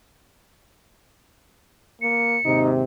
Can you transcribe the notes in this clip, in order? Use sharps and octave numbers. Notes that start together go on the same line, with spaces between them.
A#3 C#7
D#2 G#2 C3 D#4